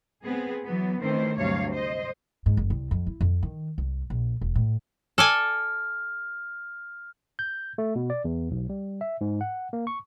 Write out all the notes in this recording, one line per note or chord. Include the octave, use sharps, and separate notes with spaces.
B3 C4 G#4
E3 F#3 B3
D#3 E3 A3 C4 C#4 C5
D2 G2 C3 F#3 C#5 F5
C5 D#5
G#2
F#1
C2
F2
E4
F2
D#3
C2
A#1
E1
A2
A4 D5 G#5 F6
G6
A3
B2
D5
E2
B1
G3
E5
G#2
F#5
A#3
C#6